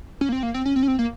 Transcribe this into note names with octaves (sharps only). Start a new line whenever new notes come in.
C#4
A#3
C4
A#3
C4
C#4
C4
C#4
C4
A#3